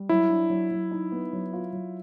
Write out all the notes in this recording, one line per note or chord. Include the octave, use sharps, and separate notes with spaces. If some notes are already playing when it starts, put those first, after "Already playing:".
Already playing: G3
F#3 E4
D4
F#3
F#3
D#4
B3
F#3
F4
F#3